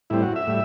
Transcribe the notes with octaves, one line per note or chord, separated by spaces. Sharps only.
A2 G3 C4 E4
F#4
E5
A2 G3